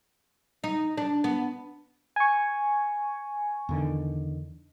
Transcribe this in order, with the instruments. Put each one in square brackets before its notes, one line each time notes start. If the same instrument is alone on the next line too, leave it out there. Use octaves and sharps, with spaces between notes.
[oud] D#4
D4
B3
[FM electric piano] G#5 C#6
[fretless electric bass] E2 D3 D#3